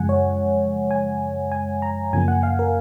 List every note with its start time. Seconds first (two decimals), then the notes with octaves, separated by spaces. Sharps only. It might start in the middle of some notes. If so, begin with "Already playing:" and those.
Already playing: F#2 C#3 F3 G#3 F#5 G#5
0.09 C#5
0.91 G#5
1.52 G#5
1.82 A#5
2.13 F#2 C#3 F3 A#3 G#5
2.28 F#5
2.43 F5
2.59 A#4